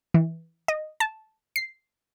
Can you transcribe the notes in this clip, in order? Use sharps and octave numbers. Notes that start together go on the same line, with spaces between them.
E3
D#5
A5
C7